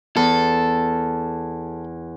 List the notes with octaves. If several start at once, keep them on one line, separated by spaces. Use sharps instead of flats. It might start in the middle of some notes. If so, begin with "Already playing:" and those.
E2 A4